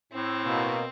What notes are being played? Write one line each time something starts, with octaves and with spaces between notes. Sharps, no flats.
A2 C4
B2 A#3